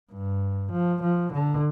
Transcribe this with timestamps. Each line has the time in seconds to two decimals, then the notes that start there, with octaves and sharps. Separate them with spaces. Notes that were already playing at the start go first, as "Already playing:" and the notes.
0.12 G2
0.72 F3
1.03 F3
1.33 D3